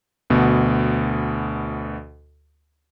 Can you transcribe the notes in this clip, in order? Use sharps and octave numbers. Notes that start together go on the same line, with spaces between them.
D2 B2